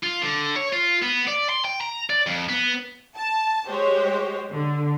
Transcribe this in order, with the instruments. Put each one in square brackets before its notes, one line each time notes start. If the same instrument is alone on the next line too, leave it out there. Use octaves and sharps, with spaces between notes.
[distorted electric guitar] F4
D3
C#5
F4
B3
D5
C6
G5
A#5
D5
F2
B3
[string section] A5
G#3 F#4 G4 C5 C#5
D3